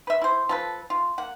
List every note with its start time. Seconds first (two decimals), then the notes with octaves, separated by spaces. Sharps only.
0.07 B4 E5
0.22 E4 C5
0.49 F3 A4 B4
0.90 F4
1.18 A#3 F#5